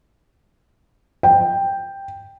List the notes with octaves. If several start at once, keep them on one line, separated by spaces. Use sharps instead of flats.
G5